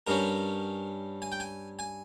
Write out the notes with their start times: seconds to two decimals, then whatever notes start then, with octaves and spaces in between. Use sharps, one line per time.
0.07 G2 G3 C#4 A#4
1.22 G#5
1.32 G5
1.40 G#5
1.79 G#5